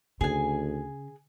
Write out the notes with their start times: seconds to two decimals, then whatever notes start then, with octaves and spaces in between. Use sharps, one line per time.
0.21 D2 C#3 G#4 G#5